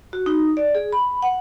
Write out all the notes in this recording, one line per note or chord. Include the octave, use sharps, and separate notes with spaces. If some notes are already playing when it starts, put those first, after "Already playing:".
F#4
D#4
D5
G#4
B5
F#5